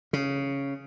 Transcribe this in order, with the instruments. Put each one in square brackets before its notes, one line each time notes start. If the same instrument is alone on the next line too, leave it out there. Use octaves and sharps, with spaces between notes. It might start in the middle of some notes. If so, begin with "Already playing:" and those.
[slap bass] C#3